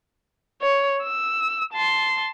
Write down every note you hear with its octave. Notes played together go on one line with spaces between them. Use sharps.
C#5
E6
A5 C6